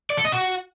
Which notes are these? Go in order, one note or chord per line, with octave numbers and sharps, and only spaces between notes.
D5
A4
D#5
F#4